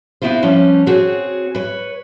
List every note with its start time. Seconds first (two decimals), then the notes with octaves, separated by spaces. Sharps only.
0.22 B3 C4 E4 F4 C5
0.43 F3 G3 B3 C#4
0.86 C4 F#4 G#4 C#5
1.55 B4 C#5